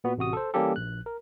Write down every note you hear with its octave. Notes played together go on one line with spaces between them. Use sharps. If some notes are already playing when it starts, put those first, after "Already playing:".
A#2 B3 F#4
A1 C3 F#4 D#6
A4 C5
E3 G3 A#3 C#4 G4 A4
A#1 F#6
A#4